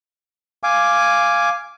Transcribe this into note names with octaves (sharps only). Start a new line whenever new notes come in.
F5 G#5 D6